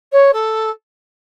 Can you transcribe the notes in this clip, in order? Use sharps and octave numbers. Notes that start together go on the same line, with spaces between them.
C#5
A4